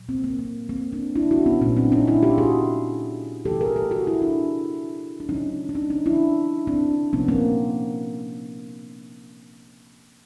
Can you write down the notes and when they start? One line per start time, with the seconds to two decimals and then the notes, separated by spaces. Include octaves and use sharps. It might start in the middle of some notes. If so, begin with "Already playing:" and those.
Already playing: A#2 F#3
0.08 A#3 C4
0.24 A#3 C4
0.39 A#3
0.69 A#3 C4
0.92 C4 D4
1.15 D4 E4
1.31 E4 F#4
1.46 B3 C#4
1.61 A#2 F#3 A3 B3 C#4
1.77 C4 D4
1.92 C#4 D#4
2.07 D4 E4
2.23 F4 G4
2.38 F#4 G#4
3.45 C3 E3 A3 G4 A4
3.61 G#4 A#4
3.76 G4 A4
3.91 F#4 G#4
4.07 E4 F#4
4.22 D4 E4
5.20 D4
5.29 C#3 F#3 A3 C#4 D#4
5.69 D4
5.75 C#4 D#4
5.90 C#4 D#4
6.06 D4 E4
6.67 C4 D4
7.13 C3 F3 A#3 B3 C#4
7.28 A#3 C4